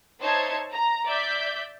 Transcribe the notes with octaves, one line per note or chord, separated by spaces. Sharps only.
D#4 C5 C#5 E5 A5 G#6
A#5
D5 E5 G6 B6